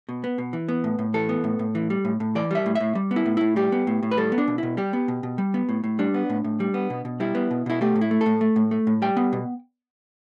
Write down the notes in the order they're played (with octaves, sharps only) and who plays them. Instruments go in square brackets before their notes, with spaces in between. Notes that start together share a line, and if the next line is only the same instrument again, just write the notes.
[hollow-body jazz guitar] B2
B3
B2
E3
B3
A2
A2
E3 A4
B3
A2
A2
E3
G3
A2
A2
E3 D5
G3 E5
A2
E5
A2
G3
B3
E4
A2
A2 E4
G3 G4
B3
A2
A2
B4
G3 A4
B3
D4
B2
B2 E4
G3 G4
B3
B2
B2
G3
B3
A2
A2
G3 D4
B3
A2
A2
G3
B3
B2
B2
G3 E4
B3
B2
B2 E4
A3 G4
A2
E4
A3
A4
A2
A3
A2
A3
A2
G3 G5
B3
B2